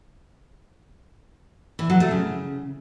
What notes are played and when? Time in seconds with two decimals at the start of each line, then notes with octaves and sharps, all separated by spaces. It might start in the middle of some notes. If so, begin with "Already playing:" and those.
1.79 E3
1.90 F#3
2.00 A3
2.11 C#3